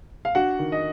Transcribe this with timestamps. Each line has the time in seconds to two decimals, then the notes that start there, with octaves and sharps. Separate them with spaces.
0.25 F5
0.35 D4 F#4 F#5
0.59 D#3
0.72 D#5